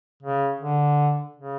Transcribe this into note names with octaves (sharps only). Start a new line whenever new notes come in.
C#3
D3
C#3